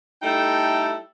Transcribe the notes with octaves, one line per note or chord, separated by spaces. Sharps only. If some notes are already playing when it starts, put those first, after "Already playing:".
G3 A3 D#4 E4 A4 G5